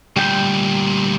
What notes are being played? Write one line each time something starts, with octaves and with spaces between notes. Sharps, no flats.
D2 A#2 G3 G5 G6